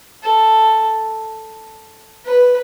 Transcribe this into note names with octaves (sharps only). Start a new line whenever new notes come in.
A4
B4